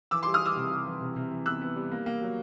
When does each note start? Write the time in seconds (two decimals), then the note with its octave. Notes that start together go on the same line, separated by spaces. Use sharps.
0.11 E3 D6 E6
0.23 C6 D6
0.26 G3
0.34 D#6 F6
0.41 G3 D6 E6
0.56 C3
0.72 G3
0.87 E3
1.01 C3
1.16 C3
1.31 E3
1.46 B3 E6 F#6
1.62 B3
1.76 G3
1.92 A#3
2.06 A#3
2.22 F#3